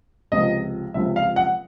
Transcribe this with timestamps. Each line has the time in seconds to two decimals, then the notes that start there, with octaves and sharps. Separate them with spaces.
0.32 C#2 C3 F3 D#5
0.94 C#2 C3 F3 E5
1.16 F5
1.36 F#5